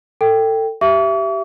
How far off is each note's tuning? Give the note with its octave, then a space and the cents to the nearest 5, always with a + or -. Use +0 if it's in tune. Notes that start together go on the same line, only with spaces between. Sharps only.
A4 +25 G5 +0
G4 -15 E5 +20 C#6 +45